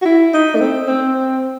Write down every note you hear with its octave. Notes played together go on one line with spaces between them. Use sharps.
F#4
E4
D#4
A3
C4
C4